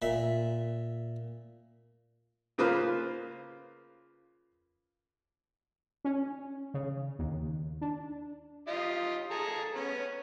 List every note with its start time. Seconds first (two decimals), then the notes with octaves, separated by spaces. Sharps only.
0.02 A#2 E5
2.58 C#3 A#3 F4 B4 C5
6.05 C#4
6.74 C#3
7.19 D#2
7.81 D4
8.68 F4 G4 D#5
9.31 G#4 A4 A#5
9.75 B3 C#4